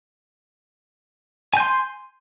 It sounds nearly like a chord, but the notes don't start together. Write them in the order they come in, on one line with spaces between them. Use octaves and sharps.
G#5 G6 C6